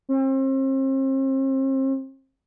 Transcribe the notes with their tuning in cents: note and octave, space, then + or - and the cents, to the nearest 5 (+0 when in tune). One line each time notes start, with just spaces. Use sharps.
C4 +40